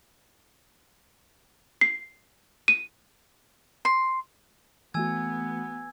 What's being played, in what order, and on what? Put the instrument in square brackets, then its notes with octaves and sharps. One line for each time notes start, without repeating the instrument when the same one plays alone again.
[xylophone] C7
D#7
[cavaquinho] C6
[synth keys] E3 A3 F#4 [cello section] B3 [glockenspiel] G#5 E6 G#6